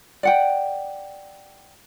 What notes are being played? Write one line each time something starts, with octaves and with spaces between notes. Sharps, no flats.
D5 F#5 G5